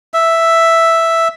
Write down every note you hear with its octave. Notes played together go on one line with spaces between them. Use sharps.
E5